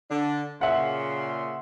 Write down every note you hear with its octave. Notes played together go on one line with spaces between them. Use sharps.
D3 D4
A#2 C#3 E5 F#5 C6